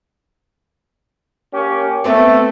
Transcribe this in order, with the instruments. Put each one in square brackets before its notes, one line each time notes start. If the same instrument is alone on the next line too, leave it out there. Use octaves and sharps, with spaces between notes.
[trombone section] A#3 C#4 G4
[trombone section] A3 [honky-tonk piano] B3 C4